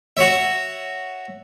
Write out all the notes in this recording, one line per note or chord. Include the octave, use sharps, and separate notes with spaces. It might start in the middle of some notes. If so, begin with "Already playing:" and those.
F#4 C#5 E5